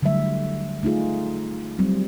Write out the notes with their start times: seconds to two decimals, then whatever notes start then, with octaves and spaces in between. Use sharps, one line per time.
0.02 D3 F#3 G3 A3 E5
0.83 A3 D#4 F4 G#4
1.79 F#3 G3 C4